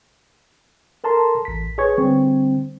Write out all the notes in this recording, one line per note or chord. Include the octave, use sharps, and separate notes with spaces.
A4 A#4 A5 A#5 C6
A1 B6
G#4 B4 C#5 G#5 C#6 G#6
D3 G3 C4